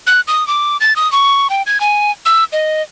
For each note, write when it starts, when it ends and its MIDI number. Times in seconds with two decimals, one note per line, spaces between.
0.07 0.20 90
0.27 0.46 87
0.47 0.77 86
0.80 0.96 93
0.96 1.10 87
1.12 1.48 85
1.50 1.62 79
1.66 1.80 92
1.81 2.11 80
2.25 2.44 88
2.52 2.82 75